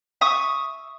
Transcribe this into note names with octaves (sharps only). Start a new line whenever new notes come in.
E5 C#6 D#6